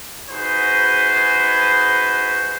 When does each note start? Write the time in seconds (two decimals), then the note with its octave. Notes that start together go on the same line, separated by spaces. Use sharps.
0.30 D#4 F#4 G#4 B4 C5